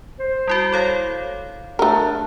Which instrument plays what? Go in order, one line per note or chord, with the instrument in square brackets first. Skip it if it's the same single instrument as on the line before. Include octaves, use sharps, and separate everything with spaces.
[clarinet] C5
[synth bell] G3 E4 F#4
A4 C#5 F5
[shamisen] A3 A#4 [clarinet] D4